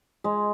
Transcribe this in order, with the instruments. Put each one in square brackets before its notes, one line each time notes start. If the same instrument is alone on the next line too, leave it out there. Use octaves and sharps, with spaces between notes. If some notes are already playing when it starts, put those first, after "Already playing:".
[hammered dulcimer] G#3